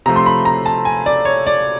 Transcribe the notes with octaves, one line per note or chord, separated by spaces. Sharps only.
C3 F3 A3 A#5
C6
B5
A#5
A5
G#5
D5
C#5
D5